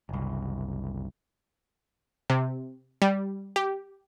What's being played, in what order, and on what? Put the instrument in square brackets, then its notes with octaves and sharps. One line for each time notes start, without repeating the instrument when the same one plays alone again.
[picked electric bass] F#1 C2
[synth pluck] C3
G3
G4